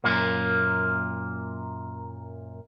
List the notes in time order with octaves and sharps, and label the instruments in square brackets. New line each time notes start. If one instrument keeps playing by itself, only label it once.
[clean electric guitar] F#2 A#2 A#3